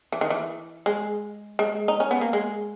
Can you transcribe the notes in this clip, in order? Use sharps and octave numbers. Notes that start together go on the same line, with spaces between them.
E3
D#3
E3
G#3
G#3
D#4
C#4
B3
A#3
G#3